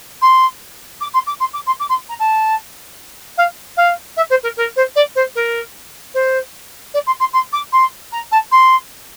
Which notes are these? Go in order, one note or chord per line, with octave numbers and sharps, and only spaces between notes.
C6
D6
C6
D6
C6
D6
C6
D6
C6
A#5
A5
F5
F5
E5
C5
A#4
A#4
C5
D5
C5
A#4
C5
D5
C6
C6
C6
D6
C6
A#5
A5
C6